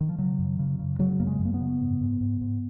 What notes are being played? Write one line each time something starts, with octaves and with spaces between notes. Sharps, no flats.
D#3
F3
C#3 F#3
F#2
C#3
C#3
C#3 F#3
F#2 A#3
G#3
F#2
A#3
B3
C#3
G#2
G#2
G#2
G#2